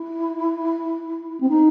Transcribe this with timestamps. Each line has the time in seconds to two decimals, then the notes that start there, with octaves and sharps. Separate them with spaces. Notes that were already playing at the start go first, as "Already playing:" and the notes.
Already playing: E4
1.40 C4
1.49 D#4